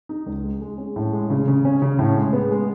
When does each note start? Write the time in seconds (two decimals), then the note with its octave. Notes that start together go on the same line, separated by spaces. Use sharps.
0.09 D#4
0.26 C#2
0.44 G#3
0.61 G#3
0.78 C#4
0.96 A2
1.13 G#3
1.30 C#3
1.48 C#3
1.65 C#4
1.82 C#3
1.99 A2
2.17 G#3
2.33 B3
2.51 G#3